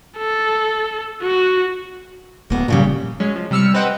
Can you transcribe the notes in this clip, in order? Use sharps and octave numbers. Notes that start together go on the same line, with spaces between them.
A4
F#4
D#1 A#3 B3
D#2 A#2 C#3 G3
F#3 G#3 C#4
F3
C3 G3 E6 F6 C#7
C4 B4 C5 D#5 F#5 G5